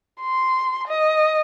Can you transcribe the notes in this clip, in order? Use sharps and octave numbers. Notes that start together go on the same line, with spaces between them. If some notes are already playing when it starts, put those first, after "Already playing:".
C6
D#5